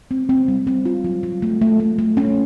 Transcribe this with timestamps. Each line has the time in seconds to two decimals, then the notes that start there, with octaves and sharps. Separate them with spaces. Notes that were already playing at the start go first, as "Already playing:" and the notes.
0.11 C4
0.29 C4
0.48 G3
0.67 C4
0.85 F4
1.04 F#3
1.23 F#3
1.42 A3
1.62 A3
1.80 A3
1.99 A3
2.17 C#4